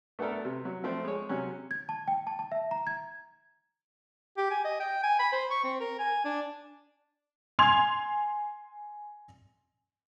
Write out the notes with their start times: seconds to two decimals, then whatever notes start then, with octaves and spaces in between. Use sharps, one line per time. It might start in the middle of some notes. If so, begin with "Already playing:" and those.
0.19 A3 B3 D4 A4 A#4
0.45 C3
0.65 F#3
0.84 F3 A3 C4
1.05 G#3 C#5
1.29 C3 F#3 C#4 F#6
1.71 G#6
1.89 A5
2.08 G5
2.27 A5
2.39 A5
2.52 E5
2.71 A#5
2.87 G#6
4.37 G4
4.51 G#5
4.64 D#5
4.80 G5
5.03 G#5
5.19 B5
5.32 C5
5.51 C#6
5.64 C4
5.80 A#4
5.99 G#5
6.25 D4
7.59 G#5 C6 G#6 F7